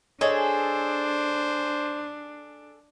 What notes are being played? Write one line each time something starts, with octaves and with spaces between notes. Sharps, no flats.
D4 G#4 A4 C5 C#5 D#5